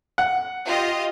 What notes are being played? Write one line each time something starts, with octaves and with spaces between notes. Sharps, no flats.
F#5
F4 G4 D#5